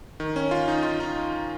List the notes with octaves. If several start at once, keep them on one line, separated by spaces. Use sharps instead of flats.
D#3
C#4
F4
D#4
F4
D#4